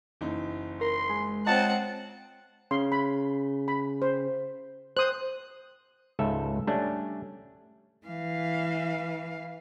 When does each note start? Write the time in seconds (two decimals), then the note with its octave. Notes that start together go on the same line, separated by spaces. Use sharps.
0.21 F#1 E3 D#4
0.81 A#4 C6
1.10 G#3
1.46 C4 F4 C#5 D#5 F#5 A5
2.71 C#3 C6
2.92 B5
3.68 B5
4.02 C5
4.97 C5 D#6 F#6
6.19 C#2 G#2 A4 E5
6.67 G3 A3 C#4 D4
8.07 E3 F5